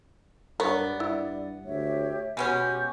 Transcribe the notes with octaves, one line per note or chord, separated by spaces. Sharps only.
G2 B3 A#4 C#5 D5
G2 E4
D2 G4 C#5 E5
B2 G#3 B3 C#4 G4 G6